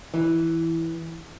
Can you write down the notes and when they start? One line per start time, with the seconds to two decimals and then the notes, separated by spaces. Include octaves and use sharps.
0.14 E3